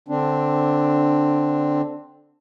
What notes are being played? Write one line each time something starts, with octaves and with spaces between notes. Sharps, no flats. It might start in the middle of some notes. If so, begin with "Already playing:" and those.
D3 C4 D4